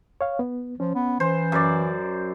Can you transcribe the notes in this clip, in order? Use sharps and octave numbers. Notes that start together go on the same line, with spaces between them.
C#5 F5
B3
F3 C#4
B3
E3 C5
F#2 D5